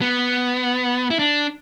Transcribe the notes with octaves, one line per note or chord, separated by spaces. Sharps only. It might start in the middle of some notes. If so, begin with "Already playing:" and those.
B3
E4
D4